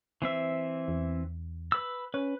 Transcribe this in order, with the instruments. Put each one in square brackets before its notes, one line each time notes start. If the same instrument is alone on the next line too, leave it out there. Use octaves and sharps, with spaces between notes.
[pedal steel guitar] E3 C4 E5
[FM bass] E2
[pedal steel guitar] B4 E6
[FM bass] C#4 [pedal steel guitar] B4